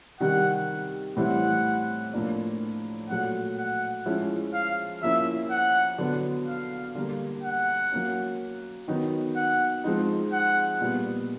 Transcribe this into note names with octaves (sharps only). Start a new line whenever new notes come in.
C3 D#3 G3 F#5
A2 E3 G3 C4 E4 F#5
A2 F3 A#3 D4
A#2 F#3 A3 F#5
F#5
F3 G#3 C#4 E4
F5
F3 A#3 C#4 E4 E5
F#5
D3 F#3 B3
F5
D3 G3 A#3
F#5
F#3 A#3 C#4
D#3 F#3 B3 D#4
F#5
F3 G#3 C4 D#4
F#5
A#2 G3 B3